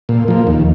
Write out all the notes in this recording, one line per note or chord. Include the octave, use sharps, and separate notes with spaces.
A#2
F3 A#3
D#2